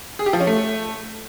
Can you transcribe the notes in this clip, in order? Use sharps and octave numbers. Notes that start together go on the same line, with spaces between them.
G#4
G4
F3
C#4
A3